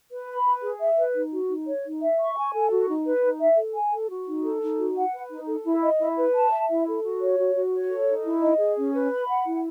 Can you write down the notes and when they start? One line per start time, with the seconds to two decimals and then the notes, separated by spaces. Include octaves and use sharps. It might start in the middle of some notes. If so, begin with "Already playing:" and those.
0.11 B4
0.28 B5
0.45 B4
0.63 G#4
0.80 E5
0.98 B4
1.15 D#4
1.32 F#4
1.50 D#4
1.66 C#5
1.84 D#4
2.01 E5
2.19 C#6
2.36 G#5
2.53 A4
2.70 F#4
2.88 D#4
3.05 B4
3.23 D#4
3.40 E5
3.57 A4
3.75 G#5
3.92 A4
4.09 F#4
4.27 D#4
4.44 A4
4.61 D#4
4.79 F#4
4.96 F#5
5.13 B4
5.31 D#4
5.48 A4
5.65 E4
5.82 D#5
5.99 E4
6.17 B4
6.35 A5
6.52 E5
6.69 E4
6.87 A4
7.03 F#4
7.21 C#5
7.39 F#4
7.55 F#4
7.73 C#5
7.90 A4
8.08 D#4
8.25 E4
8.42 D#5
8.60 G#4
8.77 C#4
8.94 B4
9.12 B5
9.29 F#5
9.46 E4